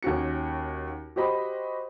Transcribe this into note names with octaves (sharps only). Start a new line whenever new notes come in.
D#2 C#4 F#4 C#7
F#4 G4 C5 D#5 B5